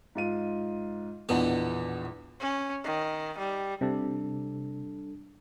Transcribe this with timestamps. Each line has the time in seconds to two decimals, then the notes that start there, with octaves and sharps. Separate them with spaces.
0.15 G#2 F4 D#7
1.29 A#1 E2 B2 D3 B3
2.40 C#4
2.84 D#3
3.38 G3
3.81 C3 G3 D4 A4